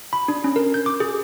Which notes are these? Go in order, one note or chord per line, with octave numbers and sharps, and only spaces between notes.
B5
D4
C#4
A#4
G6
D6
G#4